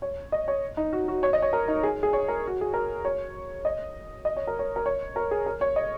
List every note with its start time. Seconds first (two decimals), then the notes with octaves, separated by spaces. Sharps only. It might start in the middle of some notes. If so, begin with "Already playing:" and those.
0.02 C#5
0.32 D#5
0.48 C#5
0.77 D#4
0.93 F#4
1.08 F#4
1.23 C#5
1.33 D#5
1.42 C#5
1.53 A#4
1.68 D#4
1.83 G#4
2.03 G#4
2.13 C#5
2.28 A#4
2.47 F#4
2.61 G#4
2.74 A#4
3.05 C#5
3.65 D#5
4.25 D#5
4.36 C#5
4.47 A#4
4.59 C#5
4.76 A#4
4.86 C#5
5.16 A#4
5.31 G#4
5.46 A#4
5.61 C#5
5.76 D#5